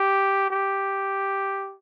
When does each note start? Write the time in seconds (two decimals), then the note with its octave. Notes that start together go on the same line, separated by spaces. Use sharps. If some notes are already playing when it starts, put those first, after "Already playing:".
Already playing: G4
0.50 G4